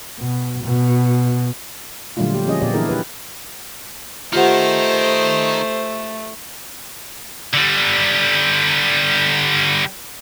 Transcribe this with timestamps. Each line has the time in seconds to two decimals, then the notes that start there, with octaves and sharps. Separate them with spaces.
0.19 B2
0.64 B2
2.17 A#2 D3 F#3 G3 A3 F4
2.34 G4
2.47 F3 C#4 G#4 D#5
2.62 A#2 B3 G4 D5
2.74 E3 D4 E4 G#4 A#4
2.89 G4 B4
4.33 D#3 A3 D#4 F4 G4 C5 F#5
7.54 D3 G3